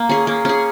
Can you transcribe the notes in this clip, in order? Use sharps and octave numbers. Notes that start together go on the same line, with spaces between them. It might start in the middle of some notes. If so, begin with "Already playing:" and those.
Already playing: A#3
C#4 G#4
A#3
C#4 G#4